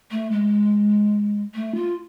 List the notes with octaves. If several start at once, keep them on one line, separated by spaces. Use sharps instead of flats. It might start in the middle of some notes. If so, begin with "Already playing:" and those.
A3
G#3
A3
F4